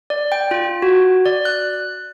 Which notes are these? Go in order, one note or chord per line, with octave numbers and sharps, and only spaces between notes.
D5
G5
F4
F#4
D5
F#6